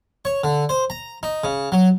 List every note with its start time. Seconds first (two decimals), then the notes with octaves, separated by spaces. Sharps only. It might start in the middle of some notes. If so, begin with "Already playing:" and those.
0.25 C#5
0.44 D3
0.69 C5
0.90 A#5
1.23 D#4
1.44 C#3
1.72 F#3